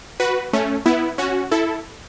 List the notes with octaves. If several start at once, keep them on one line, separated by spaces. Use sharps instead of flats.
F#4 B4
A3 C#4
B3 E4
C#4 F#4
E4 A4